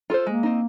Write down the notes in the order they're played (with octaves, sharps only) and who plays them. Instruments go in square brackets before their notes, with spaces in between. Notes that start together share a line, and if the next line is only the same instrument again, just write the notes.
[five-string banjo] F4 A4 C5
[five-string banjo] G#3 [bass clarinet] A#3
[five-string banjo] C4 D#4